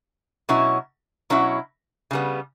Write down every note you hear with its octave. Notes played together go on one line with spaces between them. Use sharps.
B2 F#3 C#4 E4
B2 F#3 C#4 E4
C#3 G3 B3